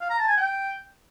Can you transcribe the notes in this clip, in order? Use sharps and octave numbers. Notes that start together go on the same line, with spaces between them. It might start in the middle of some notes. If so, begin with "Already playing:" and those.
F5
A#5
A5
G#5
G5